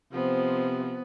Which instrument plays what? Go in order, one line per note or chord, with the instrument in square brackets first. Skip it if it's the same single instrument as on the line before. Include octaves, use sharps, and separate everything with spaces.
[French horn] C3 [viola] F3 C4 [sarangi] B3